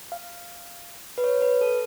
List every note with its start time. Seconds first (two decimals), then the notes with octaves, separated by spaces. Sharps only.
0.12 F5
1.18 B4
1.24 C#5
1.42 B4
1.61 A4